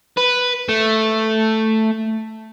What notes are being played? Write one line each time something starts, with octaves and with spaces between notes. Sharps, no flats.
B4
A3